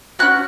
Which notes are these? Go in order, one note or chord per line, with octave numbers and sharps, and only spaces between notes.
C#4 F#4 F#6